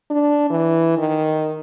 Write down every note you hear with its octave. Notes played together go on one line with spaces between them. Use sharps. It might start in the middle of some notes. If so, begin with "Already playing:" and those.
D4
E3
D#3